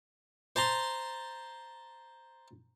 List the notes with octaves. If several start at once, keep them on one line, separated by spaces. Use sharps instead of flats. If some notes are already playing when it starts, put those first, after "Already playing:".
C5 A5 A#5 C6